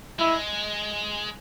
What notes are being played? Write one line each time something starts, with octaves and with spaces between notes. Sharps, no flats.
G#3 E4